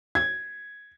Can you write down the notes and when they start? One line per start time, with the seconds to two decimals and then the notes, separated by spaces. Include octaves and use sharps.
0.15 G#6